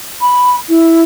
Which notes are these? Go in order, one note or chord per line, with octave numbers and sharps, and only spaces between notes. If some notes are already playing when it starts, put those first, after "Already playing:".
B5
E4